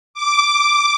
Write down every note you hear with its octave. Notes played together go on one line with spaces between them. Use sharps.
D6